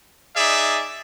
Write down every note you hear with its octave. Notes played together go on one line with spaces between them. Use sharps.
D#4 G#4 D5 E5